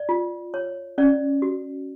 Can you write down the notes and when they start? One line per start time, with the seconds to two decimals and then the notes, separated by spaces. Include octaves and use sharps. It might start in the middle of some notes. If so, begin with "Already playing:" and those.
Already playing: D5
0.09 F4
0.54 C#5
0.98 C#4 D5
1.42 F#4